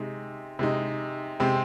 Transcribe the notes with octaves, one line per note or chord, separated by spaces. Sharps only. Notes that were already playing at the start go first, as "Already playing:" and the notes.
Already playing: C3 G#3 D#4
C3 G#3 D#4
C3 G#3 C4